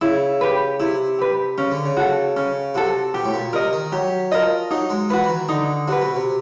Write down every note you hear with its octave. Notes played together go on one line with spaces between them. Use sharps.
C#3 E4
G4 B4
C3 E4
G4 B4
C#3 C#4
D3
C#3
F#4 A4
C#3 C#4
C3 F#4 A4
B2 G4
A2
A#2
C3 A#4 D#5
D#3
F#3 G4
F3 A#4 D#5
F#3 D#4
G#3
E3 F#4 B4
E3
D#3
D3 D#4
C3 F#4 B4
B2
C3